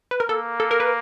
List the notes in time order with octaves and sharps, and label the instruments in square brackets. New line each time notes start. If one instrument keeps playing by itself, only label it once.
[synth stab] B4
A#4
[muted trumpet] A#3 [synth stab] A4
[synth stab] A4
A#4
B4